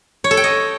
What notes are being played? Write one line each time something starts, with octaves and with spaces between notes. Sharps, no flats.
C#5
A4
G5
D#5